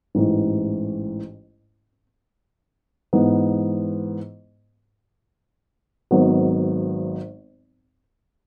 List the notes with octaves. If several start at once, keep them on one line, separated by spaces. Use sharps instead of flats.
A1 G#2 E3
G#2 E3 B3
G#1 G#2 F#3 B3